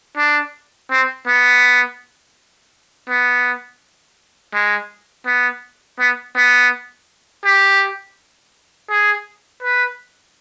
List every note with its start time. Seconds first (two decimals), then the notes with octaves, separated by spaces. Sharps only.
0.17 D4
0.91 C4
1.27 B3
3.09 B3
4.54 G#3
5.26 B3
5.99 B3
6.36 B3
7.45 G4
8.90 G#4
9.63 B4